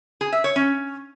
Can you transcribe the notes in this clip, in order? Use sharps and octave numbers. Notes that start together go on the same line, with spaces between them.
G#4
E5
C#5
C#4